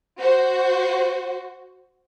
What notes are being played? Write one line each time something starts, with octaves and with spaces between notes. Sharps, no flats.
F#4 C5